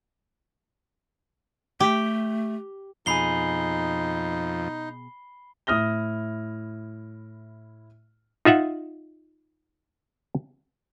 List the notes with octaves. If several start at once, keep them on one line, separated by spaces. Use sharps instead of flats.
A3 G4
F2 B2 D#4 G#4 B5 C7 G7
A2 E4 D#6 F6 A#6 G7
D#4 F4 E5 F#5